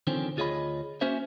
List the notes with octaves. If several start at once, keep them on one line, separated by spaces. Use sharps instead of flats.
D3 D#3 F3 C4 C#4
D2 F4 G#4 C#5 D#5 B5
A#3 C#4 F#4 C5 E5